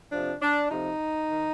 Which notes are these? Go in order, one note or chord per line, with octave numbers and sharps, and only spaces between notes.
F2 C3 F3 D4
D4
F2 C3 F3 D#4
D#3